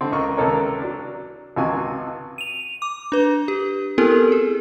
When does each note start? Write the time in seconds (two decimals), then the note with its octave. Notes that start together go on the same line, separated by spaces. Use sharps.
0.01 D3 C4
0.12 C#2 A#4 C#6
0.37 C#2 C3 D#3 A4 A#4 C#5
0.82 F#3 D4
1.56 G#1 C#2 C3 F4 F#4 G#5
2.38 D#7 F7
2.82 D6
3.12 D4 B4
3.48 G4
3.98 B3 C4 E4 G4 A4 A#4
4.32 G#4